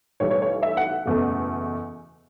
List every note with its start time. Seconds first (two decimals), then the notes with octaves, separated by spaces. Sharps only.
0.20 B1 A2 E3 G3 C#5
0.31 C#5
0.42 C#5
0.63 E5
0.77 F#5
1.06 F#1 E2 B2 A3